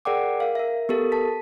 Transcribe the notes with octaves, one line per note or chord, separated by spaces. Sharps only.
G#4 A#4 D5 F#5 G5 D6
A#4 F5
A#4 E5
B3 G4 A4 A#4
A5 B6